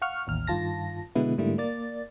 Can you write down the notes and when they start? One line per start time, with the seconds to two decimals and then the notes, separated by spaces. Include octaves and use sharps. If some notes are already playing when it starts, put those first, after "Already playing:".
0.02 F5 F#5 C#6 F6
0.27 A1 D#2 F6
0.47 G2 D#3 F4 A5 A#6
1.15 B2 D3 G#3 B3 E4
1.38 G#2 D3 G3 A3 A#3 E4
1.58 A#3 D5 A6